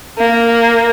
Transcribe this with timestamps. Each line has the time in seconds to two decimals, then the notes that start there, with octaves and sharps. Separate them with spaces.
0.18 A#3